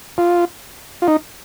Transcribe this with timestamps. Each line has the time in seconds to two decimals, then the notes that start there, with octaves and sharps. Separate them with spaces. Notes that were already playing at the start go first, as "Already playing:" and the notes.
0.18 F4
1.02 F4
1.08 D#4